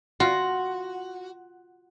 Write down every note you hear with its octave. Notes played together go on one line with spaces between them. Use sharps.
F4 F#4